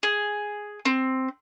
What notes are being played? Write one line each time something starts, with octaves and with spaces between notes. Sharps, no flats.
G#4
C4